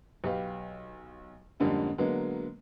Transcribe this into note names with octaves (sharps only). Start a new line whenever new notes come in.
B1 G4 B4 F5
F2 G#2 D3 G3 A#3 C#4
D3 F#3 G#3 A#3 B3